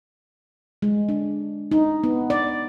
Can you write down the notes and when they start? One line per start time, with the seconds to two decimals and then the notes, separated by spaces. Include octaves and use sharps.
0.82 G#3
1.09 D4
1.71 D#4
2.04 B3
2.30 D5